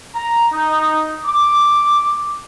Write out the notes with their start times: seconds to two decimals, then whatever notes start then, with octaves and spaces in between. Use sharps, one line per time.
0.14 A#5
0.53 D#4
1.25 D6